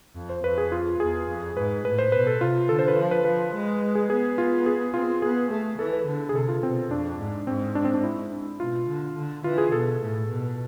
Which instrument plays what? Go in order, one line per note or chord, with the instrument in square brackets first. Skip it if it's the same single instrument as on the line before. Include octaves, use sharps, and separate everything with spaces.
[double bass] F2
[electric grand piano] C5
[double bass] F2 [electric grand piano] B4
[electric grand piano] G#4
F4
[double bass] E2 [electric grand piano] G#4
[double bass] F2
[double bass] G#2 [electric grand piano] B4
[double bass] A2 [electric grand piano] B4
[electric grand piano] C5
[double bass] B2 [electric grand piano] B4
[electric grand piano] A4
[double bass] C3 [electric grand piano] F4
[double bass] D3 [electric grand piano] A4
[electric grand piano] C5
B4
[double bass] F3 [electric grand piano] C5
[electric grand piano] B4
[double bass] F3 [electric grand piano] B4
[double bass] G#3
[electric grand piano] G#4
[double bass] B3 [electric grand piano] G#4
[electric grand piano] F4
G#4
[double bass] C4 [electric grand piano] F4
[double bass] B3 [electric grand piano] G#4
[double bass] A3 [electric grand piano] G#4
[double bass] E3 [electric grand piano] A4
[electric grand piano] B4
[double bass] D3
[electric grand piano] G#4
[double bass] C3 [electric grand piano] A4
[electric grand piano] F4
[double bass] B2 [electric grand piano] C4
[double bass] F2 [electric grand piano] D4
[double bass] G#2
[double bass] G#2 [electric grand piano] C4
[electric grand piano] D4
C4
D4
E4
[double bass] B2 [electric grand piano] F4
[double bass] D3
D3
[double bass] E3 [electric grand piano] F4
[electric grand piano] G#4
[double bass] B2 [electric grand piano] A4
[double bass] A2
B2